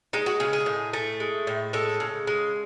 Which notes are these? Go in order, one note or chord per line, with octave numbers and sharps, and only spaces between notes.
G#3 D#4
F#4
C#3 G#4
G#4
A2
A3
G#3
A2
G#3 A4
C#3
G#3